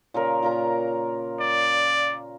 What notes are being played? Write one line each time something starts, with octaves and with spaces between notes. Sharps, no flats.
A#2 C#3 A#4
A#2 A#4 A#5
D5